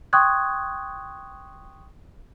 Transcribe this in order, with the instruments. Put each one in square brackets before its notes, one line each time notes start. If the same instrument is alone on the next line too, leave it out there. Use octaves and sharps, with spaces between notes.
[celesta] G5 C6 C#6 D#6 F#6 G#6